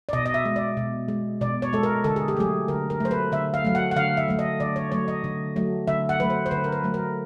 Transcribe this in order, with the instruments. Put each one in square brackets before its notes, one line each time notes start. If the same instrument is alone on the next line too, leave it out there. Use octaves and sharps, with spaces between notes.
[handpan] D5
B2 D#5
D#5
E5
G#3
D5
B2
G#3
B2 D5
C#5
G#3 A4
A#4
D3 A4
G#4
G4
F#3 A3 G#4
D3 A#4
A#4
F#3 A3 C5
B4
D3 E5
F5
F#3 A3
F#5
F#5
D3 F5
E5
F#3 A3
D#5
D3 D5
C#5
F#3 A3 C#5
D#5
D3
F#3 A3
D3 E5
F#5
F#3 A3 B4
C5
C5
D3 B4
A#4
B4
F#3 A3
A#4